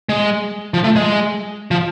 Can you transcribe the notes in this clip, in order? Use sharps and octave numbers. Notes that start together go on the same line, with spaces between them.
G#3
F3
A3
G#3
F3